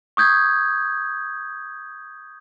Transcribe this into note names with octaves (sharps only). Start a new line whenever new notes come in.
C#6 D#6 G6 G#6